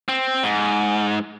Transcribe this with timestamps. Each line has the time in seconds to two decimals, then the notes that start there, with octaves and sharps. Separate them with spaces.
0.08 C4
0.43 G#2